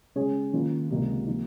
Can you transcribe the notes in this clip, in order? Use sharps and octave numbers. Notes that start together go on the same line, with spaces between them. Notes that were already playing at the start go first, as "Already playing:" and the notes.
C#3 G#3 C#4 G#4 C#5
D#3 A#3 C#4 F4
C#2 C3 G3 A#3
F3 A#3 D#4